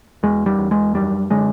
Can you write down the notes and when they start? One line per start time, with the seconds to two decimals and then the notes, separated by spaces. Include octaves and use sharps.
0.23 E2 G#3
0.46 G3
0.58 E2
0.71 G#3
0.94 F#2 G3
1.30 D3 G#3